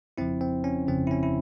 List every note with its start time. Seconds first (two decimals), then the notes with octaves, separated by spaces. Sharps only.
0.18 G1 F2 C#3 F3 C4 E4
0.41 C4
0.64 C#4
0.88 G1 F2 C#3 F3 C4
1.07 E4
1.11 C#4
1.23 E4